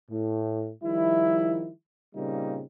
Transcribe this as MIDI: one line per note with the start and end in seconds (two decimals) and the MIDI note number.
0.11 0.69 45
0.84 1.70 51
0.84 1.70 53
0.84 1.70 55
0.84 1.70 64
2.15 2.62 46
2.15 2.62 49
2.15 2.62 55
2.15 2.62 58
2.15 2.62 60
2.15 2.62 63